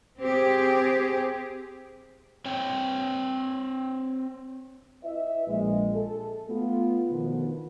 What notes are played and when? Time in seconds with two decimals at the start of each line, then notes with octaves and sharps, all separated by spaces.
0.20 C4 G4 G#4
2.45 C4 C#5 G5
5.03 E4 B4 D#5 E5
5.48 A#1 G#3
5.95 A4
6.50 A3 B3 F4
7.09 D2 B2 D#3 F3 B3